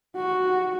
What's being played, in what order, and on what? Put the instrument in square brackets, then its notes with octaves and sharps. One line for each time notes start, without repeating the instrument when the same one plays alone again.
[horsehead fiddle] F#4